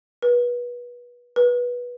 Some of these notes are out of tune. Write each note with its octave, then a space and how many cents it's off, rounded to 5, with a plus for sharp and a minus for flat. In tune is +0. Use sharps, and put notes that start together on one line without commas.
B4 -25
B4 -15